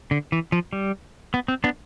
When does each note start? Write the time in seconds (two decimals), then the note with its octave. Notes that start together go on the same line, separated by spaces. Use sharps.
0.11 D3
0.32 E3
0.52 F3
0.73 G3
1.34 B3
1.48 C4
1.64 B3 D4